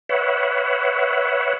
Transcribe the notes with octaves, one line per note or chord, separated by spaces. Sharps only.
B4 C#5 E5 F#5